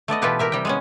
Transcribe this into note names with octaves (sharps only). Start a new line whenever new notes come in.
A3 B3 D5 D#5
B2 E3 F4 G4 A4 B4
G4 A#4 E5
C3 G3 G5
G#3 B3 C#4